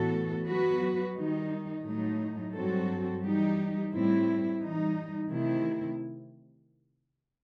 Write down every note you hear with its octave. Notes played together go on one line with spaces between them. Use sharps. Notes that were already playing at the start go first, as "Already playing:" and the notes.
Already playing: A2 E3 B3 F#4 A4
F#3 B3 F#4 B4
D#3 G3 D#4
A2 F#3 A3 D#4
G2 F#3 C4 F#4 A4
E3 G3 D#4 G4
A2 G3 C4 E4
E3 G3 D#4
C3 D#3 A3 E4